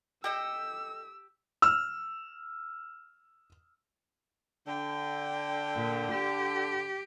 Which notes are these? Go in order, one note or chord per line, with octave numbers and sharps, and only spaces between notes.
G4 A4 D#5 G5 E6
E6 F6
D3 G5
A#2
G4